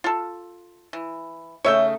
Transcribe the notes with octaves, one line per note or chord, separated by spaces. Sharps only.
F4 A4
E3
C#3 A3 D#4 C#5 E5 G5